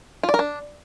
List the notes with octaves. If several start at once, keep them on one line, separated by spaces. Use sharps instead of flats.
F4
D5
A#4
D4